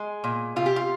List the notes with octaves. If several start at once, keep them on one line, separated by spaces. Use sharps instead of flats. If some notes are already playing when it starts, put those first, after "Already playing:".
Already playing: G#3
A#2
C3 F4
G4
F4